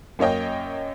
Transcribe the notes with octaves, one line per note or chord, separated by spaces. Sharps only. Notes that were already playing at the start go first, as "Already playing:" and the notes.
F#2 A#3 C#5 D#5 G5